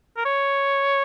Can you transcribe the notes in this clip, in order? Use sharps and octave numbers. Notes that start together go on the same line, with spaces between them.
A#4
C#5